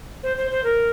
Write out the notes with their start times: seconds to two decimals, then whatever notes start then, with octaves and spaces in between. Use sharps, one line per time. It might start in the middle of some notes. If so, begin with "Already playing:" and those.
0.23 C5
0.37 C5
0.51 C5
0.64 A#4